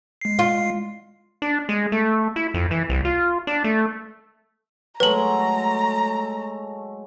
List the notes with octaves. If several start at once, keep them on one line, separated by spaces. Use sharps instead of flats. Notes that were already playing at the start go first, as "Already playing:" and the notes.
G#3 C7
F4
D4
G#3
A3
E4
F2
E3
C2
F4
D4
A3
F#3 G#3 A3 B4 A#5 F#7